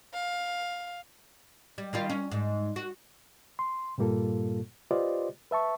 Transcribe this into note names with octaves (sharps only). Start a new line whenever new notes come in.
F5
G3
D#3 G3 F4
C#4
G#2
F#4
C6
G2 A#2 G3 A#3 F4 A4
F4 G4 B4 C5 D5 D#5
B4 E5 A5 C#6